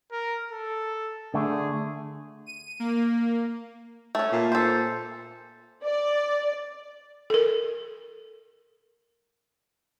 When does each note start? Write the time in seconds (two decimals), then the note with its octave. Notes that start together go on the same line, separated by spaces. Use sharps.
0.12 A#4
0.52 A4
1.34 D3 A3 G#4
2.46 D#7
2.80 A#3
4.15 A3 C#4
4.32 A#2
4.52 A4 C5
5.85 D5
7.30 A4 A#4